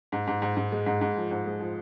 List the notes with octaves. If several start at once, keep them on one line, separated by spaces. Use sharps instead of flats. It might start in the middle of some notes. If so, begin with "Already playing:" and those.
G#2
G#2
G#2
G#2
G#3
G#2
G#2
F3
G#2
G#3
F3